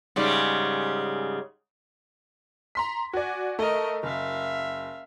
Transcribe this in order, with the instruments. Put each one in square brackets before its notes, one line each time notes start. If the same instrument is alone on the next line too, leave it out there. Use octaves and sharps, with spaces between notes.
[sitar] G#2 C#3 G3
[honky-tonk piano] A#5 C6 B6
[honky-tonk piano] F#4 D5 [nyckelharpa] G#5
[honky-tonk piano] A3 [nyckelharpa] A#4 D#5
[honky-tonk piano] F#1 [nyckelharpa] E5 F5